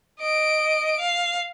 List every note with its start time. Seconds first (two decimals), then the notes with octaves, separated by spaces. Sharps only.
0.20 D#5 D7
0.99 F5